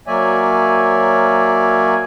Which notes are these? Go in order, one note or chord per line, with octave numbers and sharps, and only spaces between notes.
F#3 A#3 C#5 D5 E5 G#5